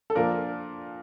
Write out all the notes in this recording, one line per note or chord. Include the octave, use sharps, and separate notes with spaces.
A4
A#2 F3 A#3 D4 A#4